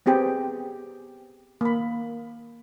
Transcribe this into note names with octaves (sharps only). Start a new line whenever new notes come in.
B3 C4 G4 G#4 G5
A#3 B5